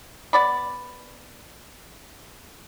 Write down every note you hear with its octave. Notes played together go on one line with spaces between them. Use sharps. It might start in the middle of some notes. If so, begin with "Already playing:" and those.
B3 D5 B5